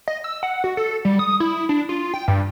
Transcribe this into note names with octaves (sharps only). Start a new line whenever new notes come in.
D#5
E6
F#5
F#4
A4
G3
D#6
E4
D4
F4
G5
G2